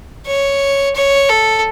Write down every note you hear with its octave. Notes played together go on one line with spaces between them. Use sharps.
C#5
C#5
A4